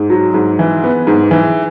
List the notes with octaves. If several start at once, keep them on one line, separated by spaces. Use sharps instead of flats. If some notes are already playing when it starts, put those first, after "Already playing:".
Already playing: G#2
F#3
G#2
E3
B3
G#2
E3